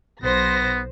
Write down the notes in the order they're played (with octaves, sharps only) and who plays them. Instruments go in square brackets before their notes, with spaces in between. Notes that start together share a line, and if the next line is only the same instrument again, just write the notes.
[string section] B1 C5 A#6 [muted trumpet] B3